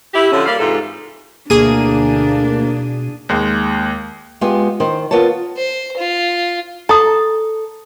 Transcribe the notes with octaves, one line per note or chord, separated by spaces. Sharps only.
E4 G4
D3 F3 F#3 C#4
G3 A#3 F5
G#2 C3 E3 F4 A4
D2 B2 A#3 D4 G#4 D#7
D#2 G#3
G#3 B3 F4 G4
D#3 C5
B3 F4 A#4 C#5 A5
C5
F4
A4 A#5 D#6